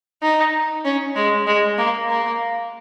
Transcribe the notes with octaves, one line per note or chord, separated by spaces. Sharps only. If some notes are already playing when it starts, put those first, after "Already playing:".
D#4
C#4
G#3
G#3
A#3
A#3